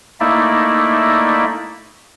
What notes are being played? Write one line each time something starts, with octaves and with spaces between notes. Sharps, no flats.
A3 A#3 D#4 E4 D5 E5